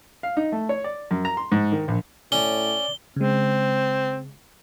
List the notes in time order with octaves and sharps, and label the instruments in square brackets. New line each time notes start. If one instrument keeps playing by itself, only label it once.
[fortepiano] F5
D#4
A3
C#5
D5
F#2
A#5
C6
G#2
D#3
A#1
[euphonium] A2 [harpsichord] C#4 [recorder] D5 [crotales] G7
[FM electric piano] C#3 G#3 [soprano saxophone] C4